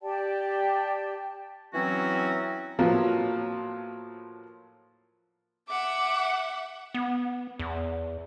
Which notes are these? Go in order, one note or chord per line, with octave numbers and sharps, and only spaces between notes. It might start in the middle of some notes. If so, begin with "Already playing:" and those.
G4 D5 G5 A5
E3 F#3 C4 C#4 F#4
A2 F3 F#3 A#3 B3 F4
E5 F#5 D6
B3
E2